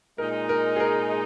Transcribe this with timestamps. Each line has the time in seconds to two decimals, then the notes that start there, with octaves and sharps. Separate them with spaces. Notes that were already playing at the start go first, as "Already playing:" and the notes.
0.18 A#2 G#3 D#4 A#4
0.49 A#4
0.76 G#4
0.80 A#4